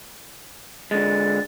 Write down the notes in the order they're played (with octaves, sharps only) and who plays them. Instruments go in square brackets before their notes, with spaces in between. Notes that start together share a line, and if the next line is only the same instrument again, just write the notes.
[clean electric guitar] D3 G#3 [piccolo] A6